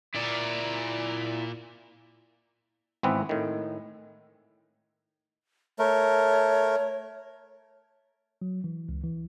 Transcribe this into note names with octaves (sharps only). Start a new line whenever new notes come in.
A#2 E4 D5
G#1 E3 B3 C4 B4 E5
A2 D#3
A3 A#4 C#5
F#3
E3
C#2
E3